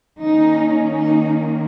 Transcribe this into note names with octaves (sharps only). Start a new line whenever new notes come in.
D#3 A#3 C#4 D#4
D#4